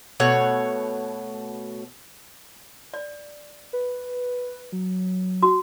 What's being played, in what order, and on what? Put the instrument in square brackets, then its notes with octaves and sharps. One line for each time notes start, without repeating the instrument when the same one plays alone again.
[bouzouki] B2 A3 C#5 F#5
[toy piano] D5
[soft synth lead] B4
F#3
[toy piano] F#4